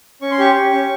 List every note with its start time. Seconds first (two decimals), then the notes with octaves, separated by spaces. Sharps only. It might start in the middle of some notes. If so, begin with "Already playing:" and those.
0.22 C#4 C#6
0.31 C6
0.39 G4 C#6
0.56 G4
0.73 C#4